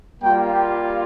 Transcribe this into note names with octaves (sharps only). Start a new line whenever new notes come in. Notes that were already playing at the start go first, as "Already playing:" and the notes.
G3 A#3 F4 G5
G4